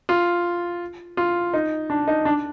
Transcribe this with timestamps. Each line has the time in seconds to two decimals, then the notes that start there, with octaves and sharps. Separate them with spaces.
0.09 F4
1.17 F4
1.54 D#4
1.90 D4
2.08 D#4
2.25 D4